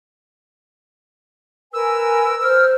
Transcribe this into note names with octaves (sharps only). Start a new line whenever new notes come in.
A#4 B4 G#5 E6
C5 F6